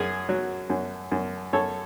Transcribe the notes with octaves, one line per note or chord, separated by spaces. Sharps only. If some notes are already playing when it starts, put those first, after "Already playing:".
Already playing: F#2 G#4
F#3
F#2
F#2
F#2 A4 C#5